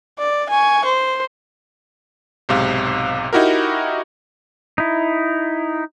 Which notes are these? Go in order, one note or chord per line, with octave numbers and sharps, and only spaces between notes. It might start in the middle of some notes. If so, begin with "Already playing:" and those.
D5
G#5 C#6
C5
B1 G#2 C3 F5
D#4 E4 F#4 G4 A#4
D#4 E4